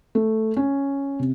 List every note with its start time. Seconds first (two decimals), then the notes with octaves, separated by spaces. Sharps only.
0.15 A3
0.57 C#4
1.20 C3